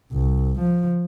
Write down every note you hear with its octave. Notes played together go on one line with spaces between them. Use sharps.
C2
F3